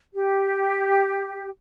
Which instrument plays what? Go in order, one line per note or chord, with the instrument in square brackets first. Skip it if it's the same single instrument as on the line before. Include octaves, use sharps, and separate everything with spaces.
[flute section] G4